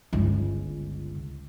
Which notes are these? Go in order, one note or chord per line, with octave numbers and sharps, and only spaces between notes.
G1 C#2